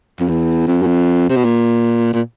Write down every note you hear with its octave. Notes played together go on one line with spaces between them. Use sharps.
F2
E2
F2
F#2
F2
C3
B2
A#2
A#2